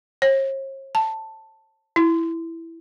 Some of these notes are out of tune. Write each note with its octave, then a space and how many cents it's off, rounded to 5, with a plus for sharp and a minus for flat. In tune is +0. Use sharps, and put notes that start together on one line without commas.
C#5 -45
A5 +5
E4 +0